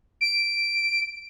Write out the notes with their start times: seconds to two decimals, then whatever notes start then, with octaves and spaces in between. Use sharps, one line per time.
0.21 D7